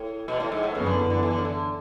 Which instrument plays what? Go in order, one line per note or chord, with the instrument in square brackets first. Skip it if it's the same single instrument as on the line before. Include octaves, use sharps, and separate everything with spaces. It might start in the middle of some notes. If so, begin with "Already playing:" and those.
Already playing: [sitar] A2
B2
A2
G#2
A2
[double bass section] F#2 E3 B3 [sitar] C#3
[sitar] D3
D3
D3
E3
D3
C#3
D3